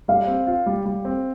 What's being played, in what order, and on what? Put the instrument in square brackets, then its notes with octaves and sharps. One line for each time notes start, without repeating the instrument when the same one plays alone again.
[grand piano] G3 [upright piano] F5
[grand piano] C4
F4
G3
G3
C4